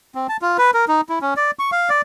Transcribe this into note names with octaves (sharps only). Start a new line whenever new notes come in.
C4
A5
F4
B4
A#4
D#4
E4
C#4
D5
C#6
F5
D5